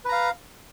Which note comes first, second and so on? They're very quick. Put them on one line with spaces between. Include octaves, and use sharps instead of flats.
B4 A#5 F5